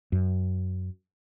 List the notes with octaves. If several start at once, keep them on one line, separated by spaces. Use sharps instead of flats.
F#2